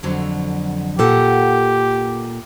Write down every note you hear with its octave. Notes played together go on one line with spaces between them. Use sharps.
F2 D3 F#3
A#2 G4 A4 F#5